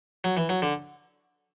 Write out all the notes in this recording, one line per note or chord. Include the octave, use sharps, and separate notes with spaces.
F#3
E3
F#3
D3